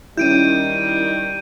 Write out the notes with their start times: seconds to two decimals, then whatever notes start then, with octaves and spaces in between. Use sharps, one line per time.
0.17 D#3 G3 C#4 D#4 E4 G6 D7 D#7